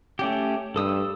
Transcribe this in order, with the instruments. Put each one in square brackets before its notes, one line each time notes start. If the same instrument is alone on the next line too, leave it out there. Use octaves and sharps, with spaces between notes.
[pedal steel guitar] A3 C#4 G4
[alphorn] G2 [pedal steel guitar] A4 D#6 E6